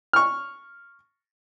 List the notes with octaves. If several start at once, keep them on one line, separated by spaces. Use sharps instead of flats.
C#6 F6